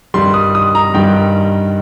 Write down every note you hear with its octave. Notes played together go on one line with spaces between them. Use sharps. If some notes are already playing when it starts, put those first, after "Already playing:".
G2 D#3 G3 C6
D#6
D#6
A#5
G2 D#3 G3 G5